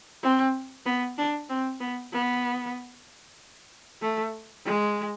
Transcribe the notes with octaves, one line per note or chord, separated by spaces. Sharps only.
C4
B3
D4
C4
B3
B3
A3
G#3